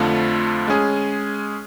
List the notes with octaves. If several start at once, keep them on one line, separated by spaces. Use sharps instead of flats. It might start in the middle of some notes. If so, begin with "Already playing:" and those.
Already playing: F2 D3 F3 A3 F4
G#3 C#4 G#4